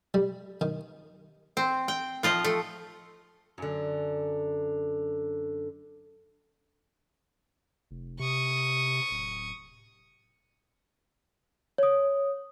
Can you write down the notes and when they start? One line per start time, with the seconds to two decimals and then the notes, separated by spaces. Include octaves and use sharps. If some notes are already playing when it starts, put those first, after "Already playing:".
0.14 G3
0.61 D#3
1.57 C4
1.88 G5
2.23 F3 F4 D#5
2.44 A3
3.58 F#2 D3
7.91 F1
8.19 C3 C#6 D#6
9.11 D1
11.78 C#5 D#6